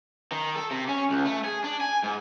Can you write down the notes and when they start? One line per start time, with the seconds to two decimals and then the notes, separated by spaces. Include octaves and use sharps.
0.32 D#3
0.56 A4
0.71 C3
0.88 C#4
1.10 C#2
1.25 A3
1.44 G#4
1.64 D4
1.81 G#5
2.03 G#2